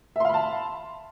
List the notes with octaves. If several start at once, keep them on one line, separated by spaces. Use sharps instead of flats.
E5 F5 A5 B5 C6